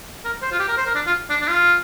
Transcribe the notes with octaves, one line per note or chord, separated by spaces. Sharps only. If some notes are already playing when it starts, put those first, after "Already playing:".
A#4
C5
F4
G4
A#4
C5
A#4
D4
F4
D4
D4
F4